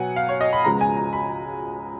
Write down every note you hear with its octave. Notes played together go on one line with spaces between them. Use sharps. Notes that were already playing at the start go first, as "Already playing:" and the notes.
Already playing: B2 F#3 B3 F#5 G#5
F5
C#5
D#5
B5
C#2 C#3 F3 G#3 B3 A#5
G#5
A#5
B5